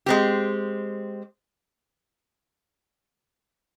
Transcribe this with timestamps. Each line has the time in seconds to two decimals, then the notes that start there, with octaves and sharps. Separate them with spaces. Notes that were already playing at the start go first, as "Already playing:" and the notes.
0.06 G#3 C4 G4